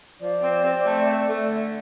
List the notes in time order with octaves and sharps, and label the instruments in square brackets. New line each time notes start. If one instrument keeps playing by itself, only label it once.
[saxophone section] F3 [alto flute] D5
[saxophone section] C4
C4
A3
A3
A3
D3